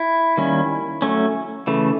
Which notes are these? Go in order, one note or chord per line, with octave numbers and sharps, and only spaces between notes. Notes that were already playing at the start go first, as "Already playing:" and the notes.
Already playing: E4
D#3 G3 A#3 C#4
F#3 A3 C#4
C#3 E3 A3